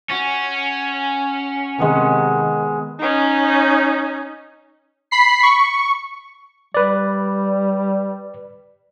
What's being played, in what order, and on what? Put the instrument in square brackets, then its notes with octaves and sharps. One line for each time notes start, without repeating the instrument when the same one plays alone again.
[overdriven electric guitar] C#4 [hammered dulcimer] F#4
[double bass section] C3 D#3 [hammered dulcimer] G#3 B3 A#4
[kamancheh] C#4 D#4
[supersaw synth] B5 B6 C7
C#6
[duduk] G3 [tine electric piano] B4 D5